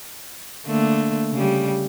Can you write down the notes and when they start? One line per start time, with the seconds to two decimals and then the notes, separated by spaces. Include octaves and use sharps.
0.66 D3 A3 A#3
1.33 C#3 G3